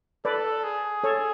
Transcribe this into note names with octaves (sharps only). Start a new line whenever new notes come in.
A4 B4 D5
G#4
A4 C#5